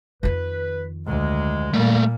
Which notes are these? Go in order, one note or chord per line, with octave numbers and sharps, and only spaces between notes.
F2 D#3 B4
D2 G#3
A#2 G3 A3 A#3